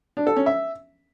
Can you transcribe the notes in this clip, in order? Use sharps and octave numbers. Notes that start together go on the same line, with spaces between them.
D4
A4
C#4
E5